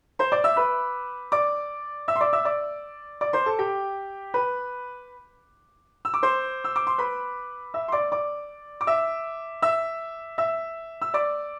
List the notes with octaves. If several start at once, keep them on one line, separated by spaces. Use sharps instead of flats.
C5 C6
D5 D6
E5 E6
B4 B5
D5 D6
E5 E6
C6
D5 D6
E5 E6
D5 D6
D5 D6
C5 C6
A4 A5
G4 G5
B4 B5
E6
D6
C5 C6
E6
D6
C6
B4 B5
E5 E6
C6
D5 D6
D5 D6
D6
E5 E6
E5 E6
E5 E6
E6
D5 D6